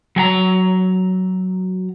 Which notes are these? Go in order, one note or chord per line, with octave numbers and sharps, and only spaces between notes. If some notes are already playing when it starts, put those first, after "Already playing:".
F#3 G#5 A#5